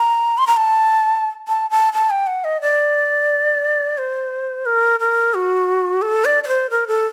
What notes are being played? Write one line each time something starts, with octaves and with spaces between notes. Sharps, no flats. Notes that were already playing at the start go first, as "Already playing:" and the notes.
Already playing: A#5
C6
A#5
A5
A5
A5
A5
G5
F#5
D#5
D5
C5
A#4
A#4
F#4
A4
D5
D5
C5
A#4
A4